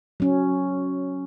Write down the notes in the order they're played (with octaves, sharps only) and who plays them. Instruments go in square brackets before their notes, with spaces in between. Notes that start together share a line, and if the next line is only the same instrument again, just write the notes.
[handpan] F#3 C#4